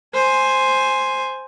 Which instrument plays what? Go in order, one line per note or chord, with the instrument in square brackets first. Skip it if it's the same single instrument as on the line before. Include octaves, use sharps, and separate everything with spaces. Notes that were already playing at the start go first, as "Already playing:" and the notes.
[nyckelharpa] C5 G#5